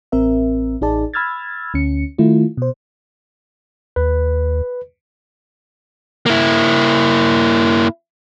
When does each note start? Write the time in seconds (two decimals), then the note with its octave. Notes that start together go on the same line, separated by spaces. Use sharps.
0.12 A1 C4 A#4 E5
0.81 A1 D#4 G#4 D5 A5
1.14 B5 E6 F6 G#6 A6
1.74 D2 C#4 C#7
2.18 D#3 A3 E4 F4
2.57 B2 C5
3.96 D#2 B4
6.26 A#3 E4